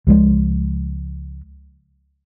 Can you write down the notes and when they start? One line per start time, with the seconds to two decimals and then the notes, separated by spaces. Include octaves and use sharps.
0.07 C#2 F3 G#3